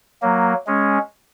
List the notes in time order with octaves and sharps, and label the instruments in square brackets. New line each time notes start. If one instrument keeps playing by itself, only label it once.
[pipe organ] F#3 A#3
G#3 C#4